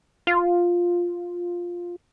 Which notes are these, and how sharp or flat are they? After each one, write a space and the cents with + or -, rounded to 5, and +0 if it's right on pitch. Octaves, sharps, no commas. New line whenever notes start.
F4 +5